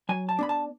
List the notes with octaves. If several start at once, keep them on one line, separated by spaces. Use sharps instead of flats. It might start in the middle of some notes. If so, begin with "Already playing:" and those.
F#3 G#5
A5
B3 D4 B5
A5